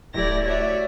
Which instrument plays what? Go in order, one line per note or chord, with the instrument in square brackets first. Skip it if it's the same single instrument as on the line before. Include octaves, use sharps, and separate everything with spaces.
[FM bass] D1 [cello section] A3 E4 G4 [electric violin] D5 A#6
[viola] F#4 D5 [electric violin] C#5 [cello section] E5